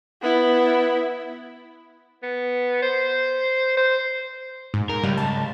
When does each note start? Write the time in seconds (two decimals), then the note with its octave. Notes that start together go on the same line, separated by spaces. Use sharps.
0.22 B3 E4
2.23 B3
2.82 C5
3.77 C5
4.74 G#2
4.89 G#2 A#4
5.03 C#2 G3
5.17 A5